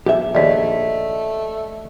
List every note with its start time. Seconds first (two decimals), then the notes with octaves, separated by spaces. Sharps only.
0.06 B1 G4 E5
0.35 A#1 D#2 A3 D5 D#5 B6